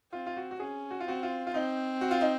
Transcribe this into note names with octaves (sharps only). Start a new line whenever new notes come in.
C4 F4
F4
F#4
F#4
C#4 G#4
F#4
F4
C4 F#4
F4
F4
C4 D#4
F#4
F4
D#4